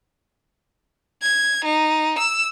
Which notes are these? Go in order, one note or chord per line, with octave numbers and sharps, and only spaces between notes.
G#6
D#4
E6